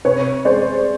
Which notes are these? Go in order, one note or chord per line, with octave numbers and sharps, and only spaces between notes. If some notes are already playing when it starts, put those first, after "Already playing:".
C3 B4 C#5
G#3 C5 D5